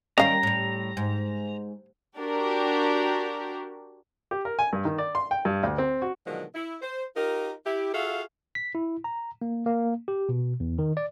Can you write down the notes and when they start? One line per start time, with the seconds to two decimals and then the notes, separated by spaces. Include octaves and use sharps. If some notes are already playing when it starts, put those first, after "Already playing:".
0.18 D#3 G3 A#3 C#4 F5 A#5
0.43 A2 G3
0.97 G#2
2.18 D4 F#4 G4 A#4
4.31 G4
4.45 A#4
4.59 G#5
4.73 G2
4.85 D#3
4.98 D5
5.15 C6
5.31 G5
5.45 G2
5.63 D2
5.78 C4
6.02 F#4
6.26 B2 D3 D#3 F3 F#3 G#3
6.55 E4
6.82 C5
7.16 D#4 F4 G4 A#4
7.65 E4 G4
7.93 F4 F#4 G#4 A4 E5 F5
8.55 B6
8.75 E4
9.04 A#5
9.42 A#3
9.66 A#3
10.08 G4
10.29 B2
10.60 E2
10.79 D#3
10.97 D5